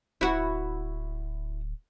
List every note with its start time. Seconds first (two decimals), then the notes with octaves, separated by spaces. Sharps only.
0.21 D1 E4 F#4